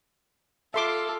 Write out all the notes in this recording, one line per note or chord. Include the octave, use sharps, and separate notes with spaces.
F4 A4 E5 C6 D6